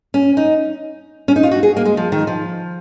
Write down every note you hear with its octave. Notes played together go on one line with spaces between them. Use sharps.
C#4
D#4
C#4
D#4
F4
F#4
G#4
A#3
G#3
F3
D#3
F3